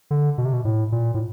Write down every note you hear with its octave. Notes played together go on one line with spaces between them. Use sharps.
D3
B2
C3
B2
A2
A#2
A2